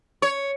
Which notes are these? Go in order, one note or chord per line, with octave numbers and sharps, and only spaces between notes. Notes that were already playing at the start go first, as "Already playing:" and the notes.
C#5